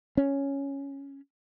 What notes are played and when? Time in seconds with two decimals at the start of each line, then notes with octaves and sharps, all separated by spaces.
0.17 C#4